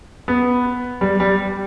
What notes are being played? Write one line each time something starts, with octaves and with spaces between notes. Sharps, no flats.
B3
G3
G3